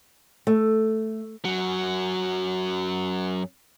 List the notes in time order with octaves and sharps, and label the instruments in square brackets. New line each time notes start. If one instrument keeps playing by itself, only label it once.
[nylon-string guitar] A3
[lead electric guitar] F#2 F#3